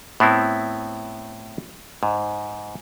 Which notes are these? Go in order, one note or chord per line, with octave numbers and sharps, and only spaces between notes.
A2 B3 C4 E4
G#2